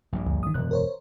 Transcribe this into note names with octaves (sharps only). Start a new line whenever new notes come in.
A#1 G2 A#2
D2
D#3 D#6
E1 F#2 F#6
A#4 C5 C#5